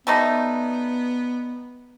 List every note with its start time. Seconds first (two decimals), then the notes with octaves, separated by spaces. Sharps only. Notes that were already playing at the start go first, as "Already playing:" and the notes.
0.07 G3 A3 B3 D#4